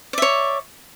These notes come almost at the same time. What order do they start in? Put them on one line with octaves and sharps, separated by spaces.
D5 E5 C#5